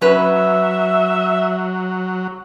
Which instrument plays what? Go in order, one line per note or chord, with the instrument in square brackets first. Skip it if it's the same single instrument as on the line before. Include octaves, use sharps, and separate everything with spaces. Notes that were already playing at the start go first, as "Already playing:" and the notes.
[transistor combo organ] F#3 [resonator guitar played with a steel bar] C#4 B4 [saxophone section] E5